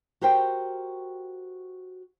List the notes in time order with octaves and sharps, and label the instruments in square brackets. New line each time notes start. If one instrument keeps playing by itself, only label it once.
[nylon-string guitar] F#4 G4 A#4 C5 G5